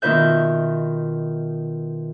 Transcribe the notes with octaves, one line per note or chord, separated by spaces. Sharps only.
B2 D#3 F4 B4 E5 G6